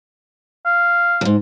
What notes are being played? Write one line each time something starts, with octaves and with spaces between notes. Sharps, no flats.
F5
E2 G#2